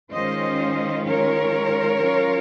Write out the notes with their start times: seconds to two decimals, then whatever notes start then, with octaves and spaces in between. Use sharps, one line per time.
0.11 D#3 G#3 C#4 F4 C5 D#5
1.06 A#4 C#5
2.01 F#3 C#4 F4